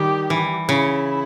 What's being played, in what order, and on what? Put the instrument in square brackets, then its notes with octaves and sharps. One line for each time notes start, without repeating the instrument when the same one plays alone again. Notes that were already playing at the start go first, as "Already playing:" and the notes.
Already playing: [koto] D#3 G3 [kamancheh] G4
[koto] E3
[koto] C#3 [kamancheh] E4